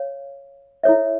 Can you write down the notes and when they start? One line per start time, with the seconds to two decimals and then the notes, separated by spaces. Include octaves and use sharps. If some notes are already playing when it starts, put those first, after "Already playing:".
Already playing: C#5 F5
0.83 E4 A4 C#5 E5